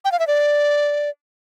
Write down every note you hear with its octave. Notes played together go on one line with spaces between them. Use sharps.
G5
F5
E5
D5